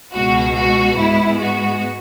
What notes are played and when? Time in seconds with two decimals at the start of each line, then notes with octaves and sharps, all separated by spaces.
0.14 C#2 B2 G#3 F#4
0.56 F#4
0.98 G#2 G#3 B3 E4
1.42 F#4